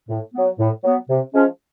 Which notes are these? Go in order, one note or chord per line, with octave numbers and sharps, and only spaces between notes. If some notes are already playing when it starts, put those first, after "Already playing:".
A2
F#3 B3
A2
F#3 B3
C3
F3 G#3 C#4